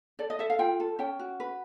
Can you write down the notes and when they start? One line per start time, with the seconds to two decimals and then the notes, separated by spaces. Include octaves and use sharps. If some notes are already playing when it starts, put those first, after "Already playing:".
0.19 A4 D5
0.30 D#5
0.39 A4 E5
0.50 F5
0.59 F4 G5
0.80 A4
0.99 C#4 G5
1.19 F#4
1.40 B4